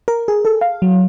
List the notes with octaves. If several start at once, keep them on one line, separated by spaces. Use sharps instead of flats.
A#4
G#4
A4
F5
F#3